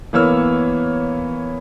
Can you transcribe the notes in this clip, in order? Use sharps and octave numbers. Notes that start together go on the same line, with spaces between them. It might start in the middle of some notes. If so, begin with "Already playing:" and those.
E3 A#3 B3 C#5 E6 F6